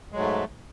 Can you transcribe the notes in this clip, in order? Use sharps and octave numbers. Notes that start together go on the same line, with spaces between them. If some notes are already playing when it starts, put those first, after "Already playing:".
G#2 F#3 G#3 A3